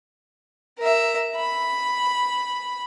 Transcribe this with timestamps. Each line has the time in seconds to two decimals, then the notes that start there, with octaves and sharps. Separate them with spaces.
0.79 A#4 E5
1.36 B5